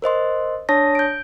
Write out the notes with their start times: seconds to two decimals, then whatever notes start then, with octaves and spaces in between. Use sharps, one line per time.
0.02 A#4 C5 D#5 C6
0.69 D4 C#5 A5 D#6 A#6
0.95 G6 D7